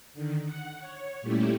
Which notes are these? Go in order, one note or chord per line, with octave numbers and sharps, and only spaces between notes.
D3 D#3
F#5
C#5
A#2 G3 A3 C#4 E4 G4